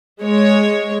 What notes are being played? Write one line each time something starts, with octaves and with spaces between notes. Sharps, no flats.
G#3 C#5